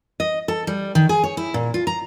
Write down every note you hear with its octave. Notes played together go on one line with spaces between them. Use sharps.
D#5
A4
G3
D#3
G#4
C#5
E4
A#2
F4
A#5